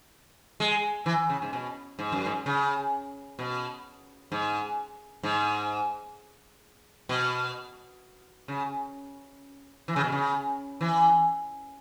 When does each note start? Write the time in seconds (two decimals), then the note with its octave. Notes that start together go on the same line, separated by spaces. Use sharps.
0.60 G#3
1.06 E3
1.30 C#3
1.42 G#2
1.53 B2
1.99 G#2
2.12 F#2
2.26 G#2
2.46 C#3
3.39 B2
4.32 G#2
5.23 G#2
7.09 B2
8.48 C#3
9.88 E3
9.96 C#3
10.04 B2
10.12 C#3
10.81 E3